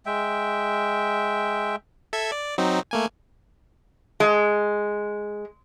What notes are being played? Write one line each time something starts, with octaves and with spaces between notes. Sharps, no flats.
G#3 E5 G5
A4 E5 G#6
D5
F#3 C4 D#4
A3 A#3 G#5
G#3